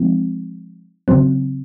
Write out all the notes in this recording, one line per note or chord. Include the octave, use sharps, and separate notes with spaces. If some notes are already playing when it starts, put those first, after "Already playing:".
Already playing: F3 G#3 C4 D#4
C#3 F#3 C4